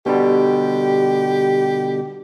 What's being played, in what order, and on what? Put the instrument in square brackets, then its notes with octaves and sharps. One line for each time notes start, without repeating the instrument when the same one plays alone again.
[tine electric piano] B2 D3 G3 [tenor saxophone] G4